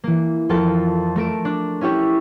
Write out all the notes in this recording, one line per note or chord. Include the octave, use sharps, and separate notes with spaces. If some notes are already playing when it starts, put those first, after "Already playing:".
E3 A#3
F2 F4 A4 A#4 A5
A3 A#4 D7 E7
D4
C#4 E4 G4 C#5 E5